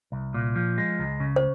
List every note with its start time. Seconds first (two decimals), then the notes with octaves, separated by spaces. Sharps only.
0.12 C2
0.34 A#2
0.56 F3
0.78 G#3
0.99 C#2
1.20 C#3
1.36 C5